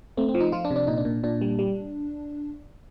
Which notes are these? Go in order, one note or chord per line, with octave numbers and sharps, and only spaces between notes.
A3 C4
C4
F3
D#4
F3 F4
D4
C3
D4
A#2 D#4
D4
A#2
A#2 D4
G3
G3